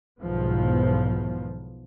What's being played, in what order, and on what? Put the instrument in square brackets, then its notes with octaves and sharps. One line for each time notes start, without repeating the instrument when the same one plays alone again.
[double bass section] B1 E2 G#2 D#3 F3 B3